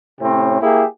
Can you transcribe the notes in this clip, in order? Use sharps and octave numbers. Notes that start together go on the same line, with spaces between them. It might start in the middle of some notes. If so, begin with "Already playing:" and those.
A2 C3 C4 C#4
A#3 E4 G4 G#4